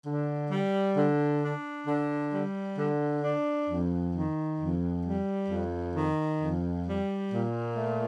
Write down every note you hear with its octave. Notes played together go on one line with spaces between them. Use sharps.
D3
G3
D3
D4
D3
G3
D3
D4
F2
D#3
F2
G3
F2
D#3
F2
G3
A#2
A3